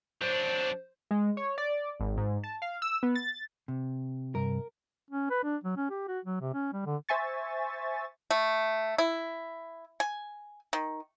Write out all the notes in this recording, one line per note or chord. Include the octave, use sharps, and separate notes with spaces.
F#3 D4 C5
G#3
C#5
D5
G#1
G#2
A5
F5
E6
B3
A6
C3
G2 C3 A#4
C#4
B4
D4
F#3
C#4
G4
F#4
F#3
C3
C#4
G3
D3
C5 E5 G#5 C#6 A6
A3
E4
G#5
D#3